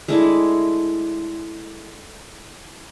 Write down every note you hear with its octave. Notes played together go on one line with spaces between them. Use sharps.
G#3 A3 D4 E4